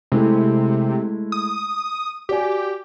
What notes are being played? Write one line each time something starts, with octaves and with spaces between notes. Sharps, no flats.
C3 G#3 A3 E4
D#6
F#4 G4 D5 G#5